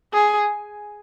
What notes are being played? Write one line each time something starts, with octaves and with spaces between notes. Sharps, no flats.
G#4